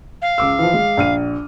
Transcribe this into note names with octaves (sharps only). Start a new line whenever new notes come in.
F5
C#2 D6 E6
E3 F3
G#3
A#1 F6 D#7